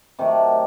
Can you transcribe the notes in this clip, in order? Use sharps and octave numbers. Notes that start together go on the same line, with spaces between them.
C3 D#3 F#3 A3